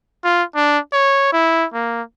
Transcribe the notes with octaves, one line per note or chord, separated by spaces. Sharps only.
F4
D4
C#5
E4
A#3